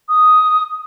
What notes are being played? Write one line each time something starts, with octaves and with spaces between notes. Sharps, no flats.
D#6